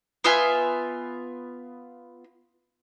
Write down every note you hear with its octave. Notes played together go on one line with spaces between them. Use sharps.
B3 F4 E5 G#5